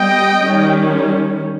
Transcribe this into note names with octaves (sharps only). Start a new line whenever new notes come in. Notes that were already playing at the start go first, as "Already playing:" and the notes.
Already playing: G3 B3 D#5 G5
D#3 G3 C#4